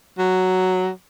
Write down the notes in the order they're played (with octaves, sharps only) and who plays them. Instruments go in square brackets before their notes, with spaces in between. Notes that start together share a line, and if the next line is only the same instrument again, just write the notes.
[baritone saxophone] F#3